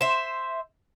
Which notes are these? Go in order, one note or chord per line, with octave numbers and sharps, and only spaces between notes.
C5 E5